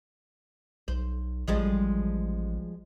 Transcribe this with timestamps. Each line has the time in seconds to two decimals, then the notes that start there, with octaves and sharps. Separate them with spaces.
0.88 B1 C5
1.48 A1 F3 G3 G#3